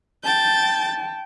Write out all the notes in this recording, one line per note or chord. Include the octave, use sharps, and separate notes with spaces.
G5 A5 G6 A6